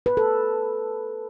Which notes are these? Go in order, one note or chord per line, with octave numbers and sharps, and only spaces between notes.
B4
A4